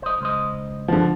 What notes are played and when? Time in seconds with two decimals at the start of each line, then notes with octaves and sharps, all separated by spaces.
0.02 C5 D#5
0.21 C#2 C5 D#5
0.88 D3 F3